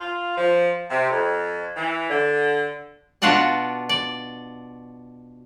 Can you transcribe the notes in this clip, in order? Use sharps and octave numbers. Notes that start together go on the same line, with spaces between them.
F4
F3
C3
F2
E3
D3
B2 D4 F4 F#4 D5 A5
D5